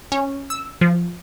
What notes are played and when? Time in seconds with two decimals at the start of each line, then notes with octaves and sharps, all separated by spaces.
0.12 C#4
0.50 E6
0.81 F3